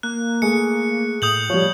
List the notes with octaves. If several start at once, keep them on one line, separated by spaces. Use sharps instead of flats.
A#3 F#6
A3 G#4 C#7
A2 D#6 G6 F#7
F3 G3 C#5